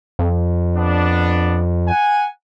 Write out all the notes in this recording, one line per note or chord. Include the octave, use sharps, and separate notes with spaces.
F2
B3 D4
F#5 G#5